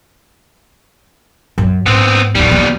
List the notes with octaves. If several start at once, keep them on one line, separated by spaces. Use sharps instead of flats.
F#2
G#2 B3 C4
D1 B2 G3 D#4
D#2 F3